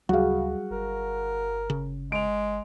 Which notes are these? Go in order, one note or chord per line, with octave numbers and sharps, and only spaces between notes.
D2 C#3 F#3 G3 F#4 G#4 F5
G1 A#4
C#3
G#3 D7 F7